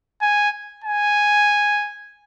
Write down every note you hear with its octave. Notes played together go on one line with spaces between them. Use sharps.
G#5
G#5